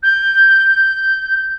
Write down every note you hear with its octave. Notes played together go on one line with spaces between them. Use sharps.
G6